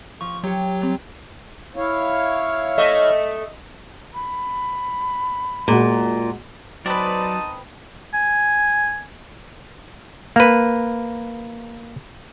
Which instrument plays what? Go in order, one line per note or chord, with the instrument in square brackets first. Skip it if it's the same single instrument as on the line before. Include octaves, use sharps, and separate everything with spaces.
[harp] F3 [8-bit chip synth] C#6
[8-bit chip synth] F#3 [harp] G4 C#5
[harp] G3 C4
[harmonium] E4 C#5 F5
[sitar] A3 D#5 E5
[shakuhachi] B5
[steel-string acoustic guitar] A#2 [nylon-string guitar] G#3 F#4
[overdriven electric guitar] F#3 [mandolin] C4 B4 [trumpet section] D#4 A5 D#6 [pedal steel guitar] D5
[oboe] G#5
[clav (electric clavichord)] A#3 B4